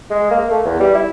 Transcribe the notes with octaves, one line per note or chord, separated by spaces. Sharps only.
G#3
A#3
A3
E2
G3
E4